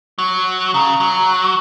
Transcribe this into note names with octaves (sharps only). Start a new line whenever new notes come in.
F#3
C#3 A#5
F#3